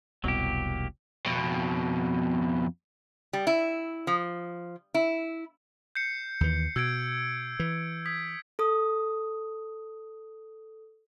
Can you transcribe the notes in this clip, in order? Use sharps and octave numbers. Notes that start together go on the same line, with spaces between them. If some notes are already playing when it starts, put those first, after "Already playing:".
F1 C2 B2 F#3 A#3 G4
F2 B2
G3
E4
F3
E4
G6 C7 C#7
D#2 E3
B2 E6 G#6 D7
E3
D#6 G#6 B6
A4 D#6